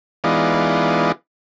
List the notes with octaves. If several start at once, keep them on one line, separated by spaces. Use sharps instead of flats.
E3 G#3 B3 D#4 F4 D5